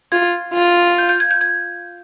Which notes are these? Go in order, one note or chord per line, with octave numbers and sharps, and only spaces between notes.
F4 G#6
F4
G6
G6
G#6
G6
G#6